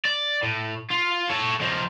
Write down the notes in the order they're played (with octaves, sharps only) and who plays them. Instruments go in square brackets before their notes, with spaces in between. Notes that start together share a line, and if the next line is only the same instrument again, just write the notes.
[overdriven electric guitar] D5
A2
F4
A4 C#5
F3 D#4